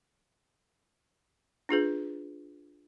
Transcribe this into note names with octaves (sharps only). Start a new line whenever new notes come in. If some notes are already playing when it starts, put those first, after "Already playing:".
D4 F4 G#4 B4